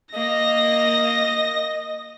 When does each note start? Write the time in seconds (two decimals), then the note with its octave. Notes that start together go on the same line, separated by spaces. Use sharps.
0.14 A#3 D#5 A#6